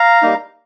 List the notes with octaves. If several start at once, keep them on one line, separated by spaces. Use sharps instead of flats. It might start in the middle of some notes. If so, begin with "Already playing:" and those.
Already playing: F5 A#5
G3 A#3 D#4